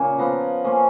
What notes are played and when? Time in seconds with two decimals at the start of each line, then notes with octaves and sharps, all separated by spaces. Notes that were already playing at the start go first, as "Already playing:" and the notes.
Already playing: A#2 C#3 A#3 C#4 G#5
0.18 F3 B3 A#5
0.64 F3 A#3 C#4